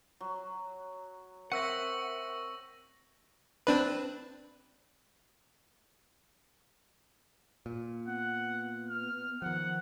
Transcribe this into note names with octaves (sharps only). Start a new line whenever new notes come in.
F#3
C4 A#4 E5 F#5 C#6 E6 A#6
C4 D4 B4
A#2
B3 F#5
F6
D#3 F3 F#5